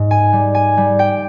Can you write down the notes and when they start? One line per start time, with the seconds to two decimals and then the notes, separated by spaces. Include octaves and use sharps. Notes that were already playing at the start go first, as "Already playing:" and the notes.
Already playing: G#2
0.11 G#5
0.33 G3
0.55 G#5
0.77 G3
0.99 G5